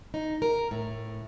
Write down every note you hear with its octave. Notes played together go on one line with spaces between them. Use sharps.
D#4
A#4
A2